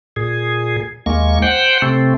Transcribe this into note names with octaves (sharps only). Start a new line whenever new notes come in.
A#2 G#4
D#2 G#3 A#3 C#6
C5 F#5 G5
C3 A3 C4